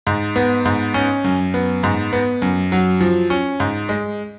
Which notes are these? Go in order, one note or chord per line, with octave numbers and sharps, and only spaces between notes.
G#2
B3
G#2
C#4
F#2
B3
G#2
B3
F#2
F#3
F3
C#4
G#2
G#3